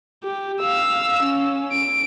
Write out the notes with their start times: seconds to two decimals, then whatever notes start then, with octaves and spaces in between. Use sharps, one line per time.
0.24 G4
0.61 F5 E6
1.23 C#4
1.72 D7